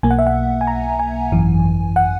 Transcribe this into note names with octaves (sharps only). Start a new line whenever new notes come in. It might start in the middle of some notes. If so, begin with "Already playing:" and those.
B1 B2 A#3 G#5
F#5
E5
F#5
G#5
A#5
G#5
G#1 F#2 E3
F#5